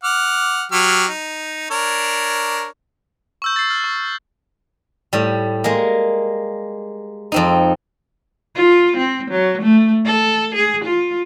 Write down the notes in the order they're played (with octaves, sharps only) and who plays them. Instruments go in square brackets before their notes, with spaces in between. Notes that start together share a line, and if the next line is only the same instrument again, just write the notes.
[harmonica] F#5 D6 F6
F#3 G4 F6
D#4
D4 A#4 C#5
[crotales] C#6 E6 G6
A6 C7
F6
C#6
[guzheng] A2 G3
G#3 A#3
F2 C4 D#4
[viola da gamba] F4
C4
F#3
A3
A4
G#4
F4